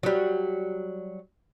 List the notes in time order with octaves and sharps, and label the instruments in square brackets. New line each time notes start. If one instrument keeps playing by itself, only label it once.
[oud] F#3 G3